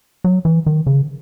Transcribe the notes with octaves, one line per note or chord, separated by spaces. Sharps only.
F#3
E3
D#3
C#3